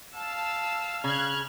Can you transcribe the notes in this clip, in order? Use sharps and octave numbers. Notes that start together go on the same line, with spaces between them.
F5 A5 E6
C#3 F6 F#6 G#6